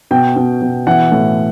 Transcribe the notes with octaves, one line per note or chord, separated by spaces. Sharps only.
B2 G5
B2
B2
E3 F#5
A2